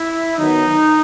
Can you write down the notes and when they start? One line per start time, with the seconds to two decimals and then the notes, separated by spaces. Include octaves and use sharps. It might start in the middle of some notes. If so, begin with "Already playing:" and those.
Already playing: E4
0.37 D#3 F#3 B3 D#4